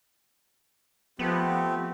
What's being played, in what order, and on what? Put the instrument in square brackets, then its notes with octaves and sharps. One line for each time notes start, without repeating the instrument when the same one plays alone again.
[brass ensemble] F3 [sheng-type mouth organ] A3 C4 G4 [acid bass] B3